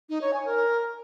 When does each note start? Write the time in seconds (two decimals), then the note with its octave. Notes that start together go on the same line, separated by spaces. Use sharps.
0.09 D#4
0.21 C#5
0.33 G#5
0.45 A#4